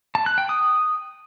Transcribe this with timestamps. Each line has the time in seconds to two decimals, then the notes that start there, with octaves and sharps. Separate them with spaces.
0.15 A5
0.26 F#6
0.38 G5
0.49 D#6